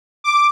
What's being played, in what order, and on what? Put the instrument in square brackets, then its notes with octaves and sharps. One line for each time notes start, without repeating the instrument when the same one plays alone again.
[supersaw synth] D6